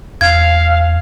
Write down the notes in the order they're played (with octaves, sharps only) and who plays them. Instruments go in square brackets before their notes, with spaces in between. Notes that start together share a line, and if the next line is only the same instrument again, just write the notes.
[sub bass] E2 [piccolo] F5 [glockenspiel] G#6